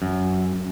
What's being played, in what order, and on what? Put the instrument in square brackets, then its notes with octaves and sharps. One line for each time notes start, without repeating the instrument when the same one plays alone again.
[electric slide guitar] F#2